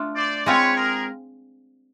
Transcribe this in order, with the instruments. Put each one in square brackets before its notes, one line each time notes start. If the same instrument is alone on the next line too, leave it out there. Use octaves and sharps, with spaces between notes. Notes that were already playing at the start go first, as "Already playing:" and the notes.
Already playing: [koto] A3 D4 F4
[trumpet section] C5 D5
[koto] G#3 C4 F4 [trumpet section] B4 C#5
[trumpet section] G#4 A#4